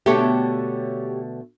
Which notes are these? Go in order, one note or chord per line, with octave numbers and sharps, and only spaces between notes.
B2 D3 A3 G4 C#5